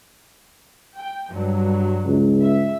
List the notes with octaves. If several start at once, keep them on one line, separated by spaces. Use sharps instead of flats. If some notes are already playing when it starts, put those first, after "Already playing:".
G5
G2 F#3
C#2
E5